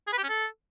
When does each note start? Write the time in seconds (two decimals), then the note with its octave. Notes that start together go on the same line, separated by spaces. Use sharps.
0.07 G#4
0.13 B4
0.18 G4
0.24 C#4
0.29 A4